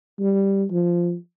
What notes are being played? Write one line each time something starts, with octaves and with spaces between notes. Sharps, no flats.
G3
F3